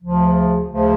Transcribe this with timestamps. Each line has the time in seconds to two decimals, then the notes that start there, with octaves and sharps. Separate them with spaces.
0.03 D2 C#3 F3
0.70 D2 C#3 F3